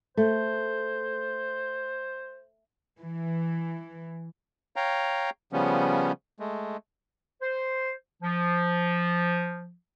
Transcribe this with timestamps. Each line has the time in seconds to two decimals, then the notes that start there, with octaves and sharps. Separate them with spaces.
0.17 A3 C5
2.99 E3
4.76 C#5 F5 G5 A#5
5.53 C#3 F3 G3 B3 C#4
6.40 G#3 A3
7.42 C5
8.23 F3